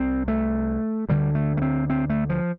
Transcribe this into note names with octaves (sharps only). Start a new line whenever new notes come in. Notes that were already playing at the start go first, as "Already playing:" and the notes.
Already playing: C2 C3 C4
A3
D2 D3 G3
A3
A3
C4
C4
A3
F3